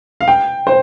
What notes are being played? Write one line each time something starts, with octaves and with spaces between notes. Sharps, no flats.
F5
G5
C5